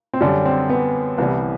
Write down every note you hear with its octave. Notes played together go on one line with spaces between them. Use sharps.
C4
F#2 D3 G3 D4
C4
B3
C2 C3 E3 G3 B3